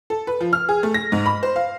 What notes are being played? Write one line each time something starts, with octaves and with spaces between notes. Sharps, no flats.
A4
B4
F3
F6
G#4
A3
A#6
G#2
B5
C5
F5